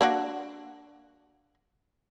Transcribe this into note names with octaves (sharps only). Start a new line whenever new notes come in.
A#3 D4 F#4